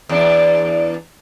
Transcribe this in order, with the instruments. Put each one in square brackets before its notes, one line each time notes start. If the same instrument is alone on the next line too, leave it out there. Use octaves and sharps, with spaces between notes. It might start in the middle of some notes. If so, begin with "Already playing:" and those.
[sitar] E2 D4